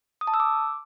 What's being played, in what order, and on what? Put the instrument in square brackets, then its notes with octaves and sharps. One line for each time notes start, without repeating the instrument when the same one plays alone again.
[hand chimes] D#6
A5
E6
D6